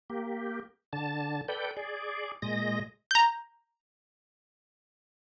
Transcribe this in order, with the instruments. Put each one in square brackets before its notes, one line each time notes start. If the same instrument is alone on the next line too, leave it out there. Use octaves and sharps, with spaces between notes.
[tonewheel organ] A#3 G4
D3 A5
A4 B4 D5 G5 G6
G#4 D5
A#2 G#3 D#5 A#6
[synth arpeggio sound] A#5 G6